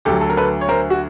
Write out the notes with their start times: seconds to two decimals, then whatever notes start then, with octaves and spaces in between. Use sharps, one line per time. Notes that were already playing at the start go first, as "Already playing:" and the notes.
0.05 D2 D3 F#3 G4 A4
0.21 A4
0.30 A#4
0.37 A4 B4
0.61 C#5
0.68 A#4 C5
0.90 F#4